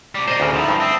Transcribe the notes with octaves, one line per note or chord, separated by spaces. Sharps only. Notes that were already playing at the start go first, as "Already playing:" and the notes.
C3 G3 D5
A#2 C4 C5 D#5
D2 C#3
F3 D#4 E4 D#5
G2
C4 E5 A5 D#6